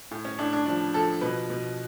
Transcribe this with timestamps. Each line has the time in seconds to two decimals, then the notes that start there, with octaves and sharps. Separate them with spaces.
0.11 A2
0.25 C#4
0.39 A2 D4
0.53 D4
0.66 F3 D4
0.94 F3 A4
1.21 B2 B4
1.50 B2